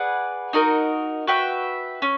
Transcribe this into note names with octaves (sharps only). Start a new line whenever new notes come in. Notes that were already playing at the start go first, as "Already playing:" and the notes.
Already playing: G#4 B4 D5 F#5
D#4 F#4 A#4 D#5
F#4 B4 E5 G5
C#4